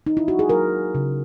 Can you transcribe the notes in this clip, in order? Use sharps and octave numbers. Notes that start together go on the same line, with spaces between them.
D#4
E4
F#4
G#4
F#3 A#4
C#3